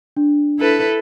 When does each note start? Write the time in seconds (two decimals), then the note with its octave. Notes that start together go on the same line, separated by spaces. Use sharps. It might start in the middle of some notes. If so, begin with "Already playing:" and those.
0.17 D4
0.59 E4 A4 B4